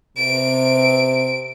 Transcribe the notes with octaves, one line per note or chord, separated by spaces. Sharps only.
C3 D7